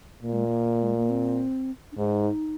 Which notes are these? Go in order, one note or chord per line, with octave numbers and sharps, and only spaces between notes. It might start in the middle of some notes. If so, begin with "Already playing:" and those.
A#2 A#3
G#3
A#3
G#3
A#3
C4
D4
G#2 D#4